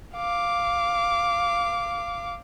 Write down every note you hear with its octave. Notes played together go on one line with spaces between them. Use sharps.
F5 D6